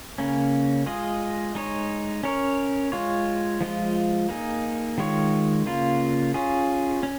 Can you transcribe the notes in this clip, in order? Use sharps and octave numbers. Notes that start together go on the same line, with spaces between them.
C#3 A#3 C#4
G#3 F4 G#4 D#5
G#3 D#4 C#5
C#4 A#4 C#5
G#3 F4 C#5
F3 G#3 F4
A#3 D#4 G#4
D#3 G#3 F4 C#5
C#3 A#3 F4
C#4 F4 G#4
C#4